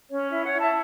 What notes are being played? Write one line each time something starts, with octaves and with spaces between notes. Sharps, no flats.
C#4 C#5
E4 E5
C#5 F#5
E4
E5 A5